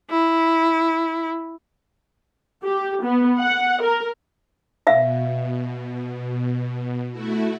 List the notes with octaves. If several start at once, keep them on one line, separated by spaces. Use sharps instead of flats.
E4
G4
B3
F#5
A#4
B2 E5 F5
A3 E4 F#4